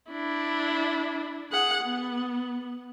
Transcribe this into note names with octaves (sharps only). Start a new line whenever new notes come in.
D4 E4
G#4 F#5
B3